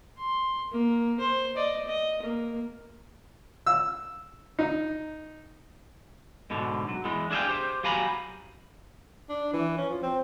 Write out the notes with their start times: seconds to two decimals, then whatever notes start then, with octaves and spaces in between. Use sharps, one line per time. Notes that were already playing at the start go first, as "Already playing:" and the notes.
0.18 C6
0.71 A#3
1.20 C5
1.56 D5 D#5
1.87 D#5
2.22 A#3
3.66 E6
4.59 D#4
6.50 G#2 B2 D3
6.88 F#3
7.05 E2 E3 G#3
7.31 D4 G#4 E5 F5 G5
7.46 G4 C5
7.83 F#3 G4 F5 G#5 A#5 B5
9.29 D4
9.53 E3
9.78 C#4
9.90 F3
10.03 C4